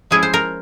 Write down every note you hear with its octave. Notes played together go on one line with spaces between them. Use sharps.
F3 G#3 C#4 E4 G#4
C5
A#4